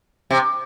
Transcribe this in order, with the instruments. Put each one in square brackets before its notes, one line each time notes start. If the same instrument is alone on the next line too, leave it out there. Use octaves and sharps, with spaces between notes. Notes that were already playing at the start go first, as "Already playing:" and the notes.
[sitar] C3